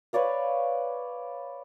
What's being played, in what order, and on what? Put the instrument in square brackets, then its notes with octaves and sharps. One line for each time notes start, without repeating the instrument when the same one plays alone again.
[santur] B4 C#5 D5 F5